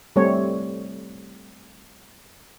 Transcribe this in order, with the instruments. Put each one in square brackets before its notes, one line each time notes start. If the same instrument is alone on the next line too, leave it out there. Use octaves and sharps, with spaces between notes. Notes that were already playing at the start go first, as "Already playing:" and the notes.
[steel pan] G3 A3 C4 C#5